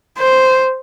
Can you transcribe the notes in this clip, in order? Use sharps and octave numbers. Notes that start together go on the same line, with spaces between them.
C5